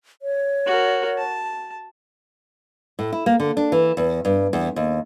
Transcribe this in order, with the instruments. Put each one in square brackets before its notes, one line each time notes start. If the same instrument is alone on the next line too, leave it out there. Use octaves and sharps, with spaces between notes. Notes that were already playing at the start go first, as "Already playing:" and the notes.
[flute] C#5
[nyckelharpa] F#4 A#4
A5
[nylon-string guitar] A2
E4
A#3
D3
D4
E3
E2
G2
E2
D#2